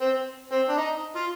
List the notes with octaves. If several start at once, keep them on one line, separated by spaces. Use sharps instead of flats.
C4
C4
D4
D#4
F4